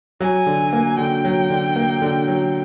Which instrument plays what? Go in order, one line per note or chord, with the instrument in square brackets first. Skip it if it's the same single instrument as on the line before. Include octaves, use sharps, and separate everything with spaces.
[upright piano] F#3 [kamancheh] G#5
[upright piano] D3
A#3
[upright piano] D3 [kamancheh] G5
[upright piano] F#3
D3
A#3
D3
F#3